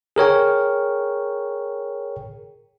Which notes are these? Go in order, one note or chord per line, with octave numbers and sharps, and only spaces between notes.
G#4 A#4 C#5 G5